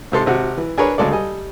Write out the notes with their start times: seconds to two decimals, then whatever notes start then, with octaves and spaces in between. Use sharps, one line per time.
0.12 G#2 C3 A4 C6
0.26 G#1 C3 F#4
0.58 E3
0.78 D4 G#4 A#4 B4 C#5
0.98 D2 C#3 G#3 A4 D5
1.12 G3 A4 D#5 G#5